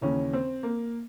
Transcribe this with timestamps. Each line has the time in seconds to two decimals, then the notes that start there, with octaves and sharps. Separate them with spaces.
0.01 D#2 C#3 E3 C#4
0.33 C4
0.63 A#3